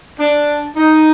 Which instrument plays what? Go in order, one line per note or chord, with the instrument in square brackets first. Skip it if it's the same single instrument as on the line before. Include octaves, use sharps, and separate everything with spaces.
[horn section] D4
D#4